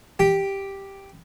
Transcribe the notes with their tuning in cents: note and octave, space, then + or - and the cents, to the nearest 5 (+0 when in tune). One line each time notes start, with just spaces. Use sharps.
G4 +0 G5 +0